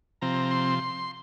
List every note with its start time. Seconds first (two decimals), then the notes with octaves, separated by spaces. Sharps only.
0.22 C3 F3 C4 A#5
0.51 C6